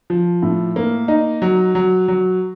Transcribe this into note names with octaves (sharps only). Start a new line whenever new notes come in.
F3
A2
A#3
D#4
F#3
F#3
F#3